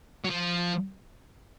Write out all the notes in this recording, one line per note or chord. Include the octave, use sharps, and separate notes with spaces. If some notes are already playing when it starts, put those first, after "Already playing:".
F#3
F3